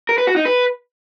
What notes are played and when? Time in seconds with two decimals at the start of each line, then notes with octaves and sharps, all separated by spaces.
0.09 A#4
0.18 B4
0.27 F#4
0.36 D#4
0.45 B4